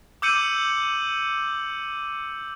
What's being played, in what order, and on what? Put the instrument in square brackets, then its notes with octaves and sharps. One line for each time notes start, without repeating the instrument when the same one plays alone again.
[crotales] D6 E6 G6 C#7 D#7 F#7